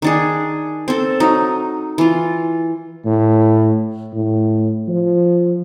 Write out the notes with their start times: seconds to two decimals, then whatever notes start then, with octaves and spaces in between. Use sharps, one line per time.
0.02 D#3 D4 G#4
0.88 C4 A4
1.20 F#3 D#4
1.98 E3 F4
3.05 A2
4.13 A2
4.88 F3